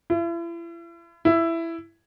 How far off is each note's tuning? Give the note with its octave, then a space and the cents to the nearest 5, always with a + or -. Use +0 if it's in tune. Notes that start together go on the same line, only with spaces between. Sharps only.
E4 +40
E4 +10